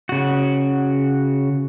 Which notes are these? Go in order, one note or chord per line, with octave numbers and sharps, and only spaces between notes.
C#3 F#4